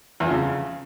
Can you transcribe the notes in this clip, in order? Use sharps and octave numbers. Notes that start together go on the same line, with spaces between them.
E2
F3
C#3